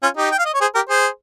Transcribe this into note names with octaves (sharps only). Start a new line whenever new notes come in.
C#4 F4
D#4 G4
G5
F5
D#5
C#5
G#4 C5
G4 A#4
G#4 C5